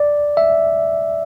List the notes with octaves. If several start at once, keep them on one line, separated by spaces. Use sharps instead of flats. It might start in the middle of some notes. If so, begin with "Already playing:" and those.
Already playing: D5
E5